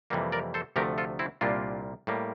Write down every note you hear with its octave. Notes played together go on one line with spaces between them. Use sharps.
F2 C3 E3 G3 A#3
A#4 D5
A4 C5
D2 C3 F3 A3 G4 A#4
F4 A4
C4 E4
C2 A#2 G3 A#3 D4 F4
A2 G3 A#3